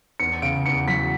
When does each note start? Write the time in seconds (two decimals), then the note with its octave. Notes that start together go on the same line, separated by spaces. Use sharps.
0.20 E2 C#7
0.42 C#3 D7
0.66 E2 C#7
0.88 F#3 B6